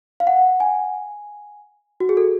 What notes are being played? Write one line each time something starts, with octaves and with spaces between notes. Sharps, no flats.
F5
F#5
G#5
F#4
G#4
A4